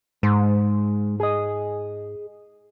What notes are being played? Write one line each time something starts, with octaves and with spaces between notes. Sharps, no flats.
G#2 G#3
G#4 D#5